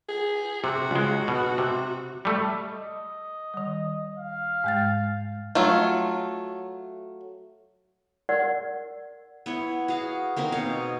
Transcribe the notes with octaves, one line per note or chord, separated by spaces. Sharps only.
G#4
C3 F#4
C#2 G#3
B2
C3
G3 A3
D#5
D#3 G3
F5
G#2 G#3 A6
F#3 A3 F4
A#4 D5 F#5
B3 E4 C#5
F#4 G#4 F5
A#3 C4 D#4 A#4
B2 C#5 F5